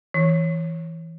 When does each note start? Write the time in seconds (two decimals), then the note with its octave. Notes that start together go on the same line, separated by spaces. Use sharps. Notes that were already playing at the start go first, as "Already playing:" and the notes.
0.14 E3